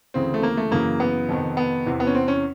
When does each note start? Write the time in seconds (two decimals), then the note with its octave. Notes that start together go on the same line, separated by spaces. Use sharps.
0.14 D2 C#3 E3 C4
0.34 A3
0.43 A#3
0.57 A3
0.71 F#2 C#3 E3 A#3
1.00 B3
1.29 F2 C3 D#3
1.57 B3
1.86 E2 C3 E3
2.00 B3
2.07 C#4
2.15 C4
2.28 C#4